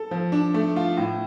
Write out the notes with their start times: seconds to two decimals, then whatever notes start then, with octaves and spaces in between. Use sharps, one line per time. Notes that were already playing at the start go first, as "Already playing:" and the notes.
Already playing: A4
0.11 F3
0.32 D4
0.54 A3
0.76 F4
0.97 A2